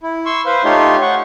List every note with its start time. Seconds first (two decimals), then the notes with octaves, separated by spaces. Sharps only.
0.03 E4
0.26 C6 C#6 E6
0.46 B4 C5 F5
0.64 A3 D#4 F4 G4 C#5 C6
1.02 F#5 C#6